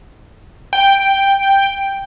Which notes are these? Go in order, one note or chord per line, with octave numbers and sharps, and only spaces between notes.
G5